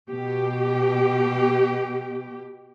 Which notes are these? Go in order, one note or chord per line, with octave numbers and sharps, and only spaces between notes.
B2 G4